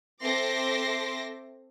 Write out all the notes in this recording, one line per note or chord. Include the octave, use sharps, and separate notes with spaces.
C4 A4 E5 C6 D6 A#6